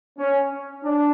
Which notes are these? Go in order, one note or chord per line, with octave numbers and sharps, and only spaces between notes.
C#4
D4